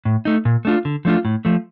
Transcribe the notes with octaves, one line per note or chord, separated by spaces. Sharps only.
A2
A3 D#4
A#2
A3 D4 F4
D3
F3 A3 D4 F4
A2
F3 A3